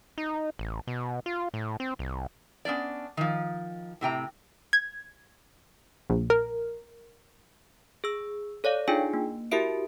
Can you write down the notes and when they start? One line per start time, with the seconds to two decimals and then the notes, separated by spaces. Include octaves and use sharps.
0.18 D#4
0.59 A1
0.87 B2
1.26 F4
1.54 A2
1.80 C4
1.99 C2
2.65 B3 C#4 D4 D5
3.17 D#3 F3
4.01 A2 C3 G5 A#5
4.73 G#6
6.10 A#1
6.30 A#4
8.04 G#4 E6
8.64 A4 C#5 D5 F5
8.88 D4 D#4 F4 G#4 G5 G#5
9.13 A#3
9.51 E4 F#4 G4 A#4 E5 D7